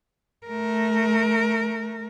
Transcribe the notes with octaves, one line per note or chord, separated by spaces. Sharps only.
A3 A#4